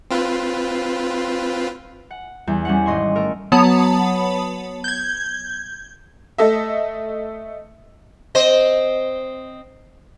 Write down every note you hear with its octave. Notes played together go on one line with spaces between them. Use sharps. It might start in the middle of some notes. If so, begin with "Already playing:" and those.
C4 F4 B4
F#5
E2 G3
G3 C#4 F#5
G#1 D#5 C6 C#6
A3 A#4
F#3 B3 C#5 A5 B5 D#6
G6 G#6
A3 A4 D#5 E5
C4 C5 D#5